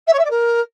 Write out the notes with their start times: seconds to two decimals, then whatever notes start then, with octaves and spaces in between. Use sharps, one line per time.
0.07 E5
0.13 C#5
0.19 E5
0.24 D5
0.30 A#4